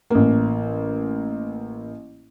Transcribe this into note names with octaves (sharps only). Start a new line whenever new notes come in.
A1 A#3